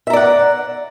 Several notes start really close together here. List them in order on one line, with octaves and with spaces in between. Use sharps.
E5 A#5 D5 F#5